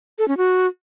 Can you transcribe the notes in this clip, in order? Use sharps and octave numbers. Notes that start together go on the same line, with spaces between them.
A4
C#4
F#4